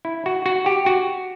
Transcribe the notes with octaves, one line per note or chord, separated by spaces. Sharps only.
E4
F#4
F#4
G4
F#4